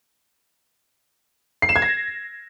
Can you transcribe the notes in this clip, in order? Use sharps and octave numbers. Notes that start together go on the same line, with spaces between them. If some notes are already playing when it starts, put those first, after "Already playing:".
C7
E7
G#6
A#6